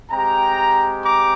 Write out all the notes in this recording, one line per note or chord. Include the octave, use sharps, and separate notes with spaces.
G#3 C4 G4 G5 A#5
A#5 D6